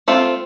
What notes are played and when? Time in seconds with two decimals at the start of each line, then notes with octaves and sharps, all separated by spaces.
0.08 A3 C4 F4